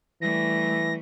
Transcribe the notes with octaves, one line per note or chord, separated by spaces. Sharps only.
E3 G3 A3 A#6